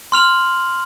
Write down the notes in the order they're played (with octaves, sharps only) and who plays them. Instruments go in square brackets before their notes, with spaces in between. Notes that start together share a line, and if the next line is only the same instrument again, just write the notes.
[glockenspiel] C6 F6 F7 F#7